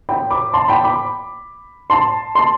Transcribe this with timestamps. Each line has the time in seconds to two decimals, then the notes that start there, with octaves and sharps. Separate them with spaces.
0.09 G5 B5
0.30 B5 D6
0.54 A5 C6
0.68 G5 B5
0.83 B5 D6
1.90 A5 C6
2.35 A5 C6